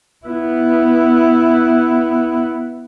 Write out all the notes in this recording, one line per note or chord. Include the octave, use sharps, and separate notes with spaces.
B3 E4